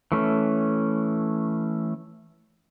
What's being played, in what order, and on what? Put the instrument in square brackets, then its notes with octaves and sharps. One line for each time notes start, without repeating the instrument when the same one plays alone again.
[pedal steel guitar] E3 A3 C#4